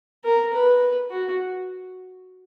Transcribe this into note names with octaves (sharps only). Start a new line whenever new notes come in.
A#4
B4
F#4